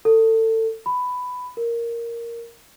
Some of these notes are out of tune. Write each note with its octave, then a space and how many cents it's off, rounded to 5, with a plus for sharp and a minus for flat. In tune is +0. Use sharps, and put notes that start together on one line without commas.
A4 +25
B5 +10
A#4 +0